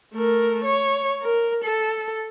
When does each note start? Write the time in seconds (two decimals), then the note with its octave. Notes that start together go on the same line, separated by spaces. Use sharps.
0.13 A3 A#4
0.64 C#5
1.23 A#4
1.64 A4